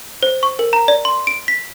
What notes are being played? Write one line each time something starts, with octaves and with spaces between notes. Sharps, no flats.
C5
C#6
A#4
A#5
D5
C6
D7
B6